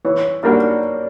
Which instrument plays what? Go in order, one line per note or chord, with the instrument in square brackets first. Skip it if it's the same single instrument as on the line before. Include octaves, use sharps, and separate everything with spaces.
[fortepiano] E3 [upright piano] C#5
[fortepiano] G3 A#3 D4 F#4 [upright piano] D5